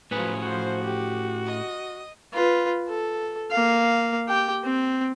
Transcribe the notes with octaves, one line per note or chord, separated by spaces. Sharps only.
A2 F3 F#3 C#4 G#4 B4
F3 F#4 C5
G4
D#5 D#6
F4 B4
A4
A#3 F5
G4 G5
C4